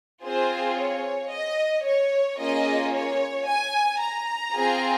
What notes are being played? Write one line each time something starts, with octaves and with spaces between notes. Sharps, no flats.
C4 F4 G#4 C5
C#5
D#5
C#5
A#3 C#4 F4 G#4 D#5
C#5
G#5
A#5
C4 F4 G#4